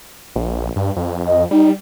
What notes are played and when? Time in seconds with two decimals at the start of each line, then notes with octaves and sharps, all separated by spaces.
0.36 A#1
0.76 G2
0.97 F2
1.26 D#5
1.51 G3 D#4